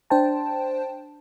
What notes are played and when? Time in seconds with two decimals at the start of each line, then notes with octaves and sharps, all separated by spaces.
0.10 D4 C5 G5 A5